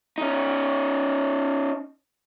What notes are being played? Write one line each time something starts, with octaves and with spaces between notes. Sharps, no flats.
C#4 D#4